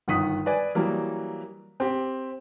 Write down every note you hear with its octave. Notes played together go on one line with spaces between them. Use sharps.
G1 D#3 F#5 D#6 B6
B4 D5 G#5
E3 F#3 G3 A#3
C4 G4